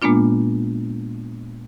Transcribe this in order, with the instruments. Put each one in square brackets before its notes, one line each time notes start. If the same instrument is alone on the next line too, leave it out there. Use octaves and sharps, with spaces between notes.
[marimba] A#2 G#3 A#3 B3 D4 F4